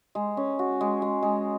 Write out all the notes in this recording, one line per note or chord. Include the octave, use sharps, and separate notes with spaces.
G#3
C#4
F#4
G#3
G#3
G#3